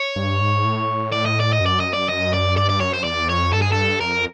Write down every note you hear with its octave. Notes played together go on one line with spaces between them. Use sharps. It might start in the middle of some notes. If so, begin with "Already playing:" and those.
Already playing: C#5
G2
G#2
A2
D5
D#5
D5
D#5
F#2
D5
D#5
D5
D#5
D5
G2 D5
D5
F#2 C#5
C5
E2 D5
F2 C#5
G2 A4
G#4
A4
F2 A#4